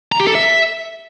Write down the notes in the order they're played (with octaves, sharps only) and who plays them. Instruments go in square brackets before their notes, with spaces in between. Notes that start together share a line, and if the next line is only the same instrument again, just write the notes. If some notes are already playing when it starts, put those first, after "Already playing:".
[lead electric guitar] A#5
G4
A4
E5